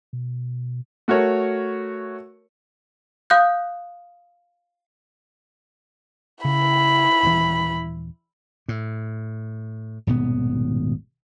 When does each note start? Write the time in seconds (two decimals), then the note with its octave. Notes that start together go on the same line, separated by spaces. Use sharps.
0.13 B2
1.08 A3 F#4 A#4 C#5
3.30 F5 D#6 F#6 G6
6.45 C#3 E4 B5
7.23 D#1 E3
8.68 A2
10.07 D#1 G#1 B2 B3